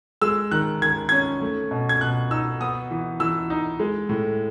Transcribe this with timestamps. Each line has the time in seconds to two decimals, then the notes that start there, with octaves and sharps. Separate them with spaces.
0.22 G#3 E6
0.51 D#3 F#6
0.82 D#3 G#6
1.09 C#4 G#6
1.41 A3
1.71 B2
1.89 G#6
2.01 B2 F#6
2.31 D#4 E6
2.61 B3 D#6
2.91 E3
3.20 E3 E6
3.50 D#4
3.80 G#3
4.09 A2